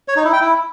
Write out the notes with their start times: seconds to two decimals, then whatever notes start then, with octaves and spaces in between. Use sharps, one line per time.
0.08 C#5
0.16 D#4
0.25 E4
0.33 G5
0.41 E4